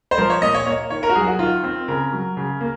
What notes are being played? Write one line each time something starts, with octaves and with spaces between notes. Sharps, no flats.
C5
F3 A#4
C#5
A#2 D#5
C#5
A#3 C#5
D#3 C#5
A#4
F#4
F#3 G#4
F#4
D#3 F4
C4
C#3 A#4
F#3
C#3
A#3